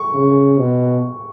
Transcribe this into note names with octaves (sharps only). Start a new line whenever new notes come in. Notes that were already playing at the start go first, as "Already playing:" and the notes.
Already playing: C#6
C#3
B2